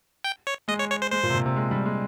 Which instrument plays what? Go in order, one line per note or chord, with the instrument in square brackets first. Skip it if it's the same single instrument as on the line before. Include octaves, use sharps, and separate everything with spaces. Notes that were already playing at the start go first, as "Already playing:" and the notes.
[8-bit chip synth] G5
C#5
[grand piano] G#3 [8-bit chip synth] D#5
[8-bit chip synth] C#5
C#5
C5
[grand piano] G#3 [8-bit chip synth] C5
[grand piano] A#2
C3
A#2
C3
G#3
G3
G#3